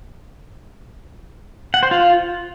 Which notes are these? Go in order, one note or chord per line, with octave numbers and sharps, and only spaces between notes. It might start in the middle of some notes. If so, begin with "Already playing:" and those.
F#5
C5
F4